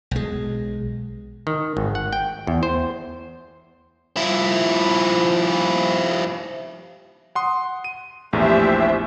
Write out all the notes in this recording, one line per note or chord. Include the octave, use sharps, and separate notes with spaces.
B1 G#3
D#3
G#1
F#5
G5
E2
C5
F3 E4
F#5 C6 D#6
D#7
A#1 E2 A2 G4 C5 E5